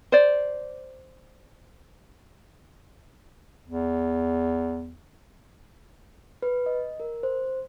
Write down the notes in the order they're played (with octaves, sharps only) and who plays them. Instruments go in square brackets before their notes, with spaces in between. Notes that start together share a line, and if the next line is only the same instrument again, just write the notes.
[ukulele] C5 D5
[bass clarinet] E2
[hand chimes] B4
D#5
A#4
C5